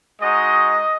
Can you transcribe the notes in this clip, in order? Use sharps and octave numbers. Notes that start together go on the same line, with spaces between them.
G#3 D#4 F#4 D#5